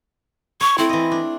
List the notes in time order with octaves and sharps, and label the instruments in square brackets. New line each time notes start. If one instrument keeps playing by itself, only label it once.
[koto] C#5 [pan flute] C#6
[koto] A3 C4 [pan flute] E4
[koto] E3 D#5
D4